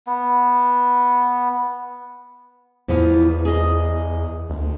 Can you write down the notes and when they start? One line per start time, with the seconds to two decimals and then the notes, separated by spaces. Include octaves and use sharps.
0.07 B3
2.88 E2 E3 F3 B3
3.45 G#4 D#5
4.50 D2